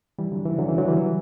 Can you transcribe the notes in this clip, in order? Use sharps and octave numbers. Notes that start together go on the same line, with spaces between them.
E3 G3
D3 F#3
C#3 E3
D3 F#3
C#3 E3
D3 F#3
E3 G3